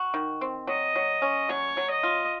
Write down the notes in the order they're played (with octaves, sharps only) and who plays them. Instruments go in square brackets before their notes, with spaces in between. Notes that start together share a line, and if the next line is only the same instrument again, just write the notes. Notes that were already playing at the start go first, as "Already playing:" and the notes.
Already playing: [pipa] F#4
D#3
C4
[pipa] F#3 [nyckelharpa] D#5
[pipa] F#3
C#4
[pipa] F#3 [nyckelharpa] C#5
[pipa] F#3
[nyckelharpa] D#5
[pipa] F4